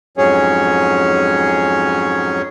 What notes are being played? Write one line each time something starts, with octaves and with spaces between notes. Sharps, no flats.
F2 G#2 F#3 C#4 G#4 C#5